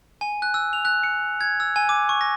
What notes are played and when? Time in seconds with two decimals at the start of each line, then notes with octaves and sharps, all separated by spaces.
0.21 G#5
0.42 F#6
0.54 E6
0.73 F7
0.85 F#6
1.03 C#7
1.41 G#6
1.60 E6
1.76 G#5
1.89 D6
2.09 C#6
2.21 A#6